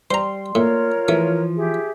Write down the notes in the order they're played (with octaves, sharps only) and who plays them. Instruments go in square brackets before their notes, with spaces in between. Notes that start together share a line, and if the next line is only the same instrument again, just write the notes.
[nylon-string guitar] G3 [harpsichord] C5 A#5 [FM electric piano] C6
[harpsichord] A2 [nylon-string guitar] A#3 [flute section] F4 A#4 C#5
[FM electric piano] E3 [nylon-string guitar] F3 [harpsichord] A3
[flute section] G4 G#4 E5